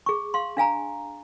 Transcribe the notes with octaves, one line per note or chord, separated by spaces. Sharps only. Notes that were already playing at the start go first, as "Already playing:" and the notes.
G#4 C#6
F5 C6
D4 F5 G#5 A#5